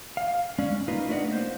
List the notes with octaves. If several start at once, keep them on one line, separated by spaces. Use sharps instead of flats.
F5
G#3 C#4 D5
A#3 D#4 F4 B4
A3 D4 A4 D5 D#5 F#5
A#3 C5